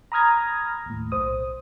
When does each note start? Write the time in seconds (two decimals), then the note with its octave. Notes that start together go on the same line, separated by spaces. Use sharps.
0.12 A#5 B5 D#6 F6 G#6 A#6
0.86 D#2 A2
1.12 B1 C5 D#6